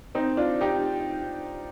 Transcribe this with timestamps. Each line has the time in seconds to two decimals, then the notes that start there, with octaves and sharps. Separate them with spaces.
0.15 C4 D#4
0.37 D4 F4
0.61 D#4 G4